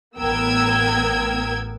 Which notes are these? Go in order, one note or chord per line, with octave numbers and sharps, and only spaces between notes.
A1 B3 A#4 G5 E6 G#6